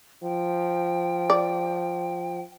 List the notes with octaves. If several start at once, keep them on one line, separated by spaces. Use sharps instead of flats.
F3 G5
D5